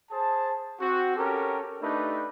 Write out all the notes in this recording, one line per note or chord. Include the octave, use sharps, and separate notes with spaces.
G#4 C5 A5
C4 F#4
C#4 G4 A4 A#4
A3 D4 D#4 G4 B4